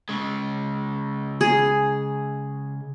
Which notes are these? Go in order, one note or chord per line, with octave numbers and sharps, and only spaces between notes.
C#3 G#3
G#4